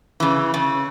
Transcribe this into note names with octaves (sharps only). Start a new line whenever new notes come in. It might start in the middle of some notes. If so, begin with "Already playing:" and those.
C#3 E3
C#3